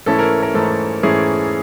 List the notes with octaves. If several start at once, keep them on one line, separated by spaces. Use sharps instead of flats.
G#2 E3 A3 C#4 E4 A4
A#4
A#4
G#2 E3 A3 C#4 E4 A4
G#2 E3 A3 C#4 E4 G#4